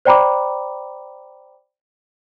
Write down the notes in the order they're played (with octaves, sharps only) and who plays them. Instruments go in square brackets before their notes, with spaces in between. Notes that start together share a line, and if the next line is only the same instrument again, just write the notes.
[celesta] C5 D5 G5 A#5 B5 D6